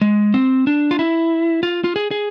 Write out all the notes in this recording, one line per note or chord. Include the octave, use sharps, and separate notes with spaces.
G#3
C4
D4
F4
E4
F4
F4
G#4
G#4